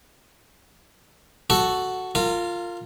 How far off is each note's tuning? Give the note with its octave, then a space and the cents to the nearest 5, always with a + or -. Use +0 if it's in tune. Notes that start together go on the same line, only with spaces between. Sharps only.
F#4 +0 A4 +0
F4 +0 A#4 -35